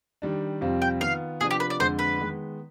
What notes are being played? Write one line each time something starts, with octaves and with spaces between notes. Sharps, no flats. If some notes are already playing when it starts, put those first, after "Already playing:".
D#3 G3 D4
F2 C3 G3 C4 F4
G5
D#3 B3 F4 F5
C3 F3 B3 D4 G#4
G4
B4
D5
F2 D3 G#3 D4 C5
B4
D#3 G#3 B3